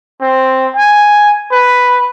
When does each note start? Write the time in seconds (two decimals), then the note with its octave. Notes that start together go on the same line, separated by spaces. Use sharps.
0.21 C4
0.76 G#5
1.51 B4